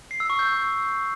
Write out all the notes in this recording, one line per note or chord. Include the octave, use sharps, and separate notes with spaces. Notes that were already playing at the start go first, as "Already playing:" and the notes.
C7
E6
C#6
G6